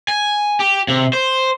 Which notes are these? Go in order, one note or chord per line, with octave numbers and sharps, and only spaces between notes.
G#5
G4
C3
C5